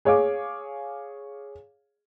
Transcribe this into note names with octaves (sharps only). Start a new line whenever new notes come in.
G#4 C#5 F5 D6